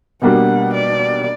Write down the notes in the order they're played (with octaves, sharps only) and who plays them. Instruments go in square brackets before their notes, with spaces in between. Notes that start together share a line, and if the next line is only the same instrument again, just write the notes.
[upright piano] B2 G3 A#3 D4 [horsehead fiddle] F#5
[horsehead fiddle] D5